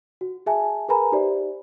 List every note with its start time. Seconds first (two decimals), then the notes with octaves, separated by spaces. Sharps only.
0.21 F#4
0.46 G#4 E5 G#5 A5
0.88 G#4 A#4 B4 G#5 A#5 B5
1.12 D#4 G4 C5 D5 E5